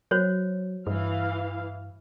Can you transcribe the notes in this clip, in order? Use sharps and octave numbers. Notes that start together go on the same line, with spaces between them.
F#3 F#4 C5 C#5
G2 E3 F5